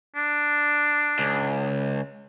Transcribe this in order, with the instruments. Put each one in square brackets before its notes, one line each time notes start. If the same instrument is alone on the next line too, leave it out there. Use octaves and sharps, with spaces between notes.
[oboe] D4
[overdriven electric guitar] C#2